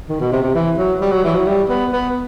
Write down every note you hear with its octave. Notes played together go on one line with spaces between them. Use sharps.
D#3
B2
C3
C3
E3
F#3
G3
F#3
E3
F#3
G3
B3
B3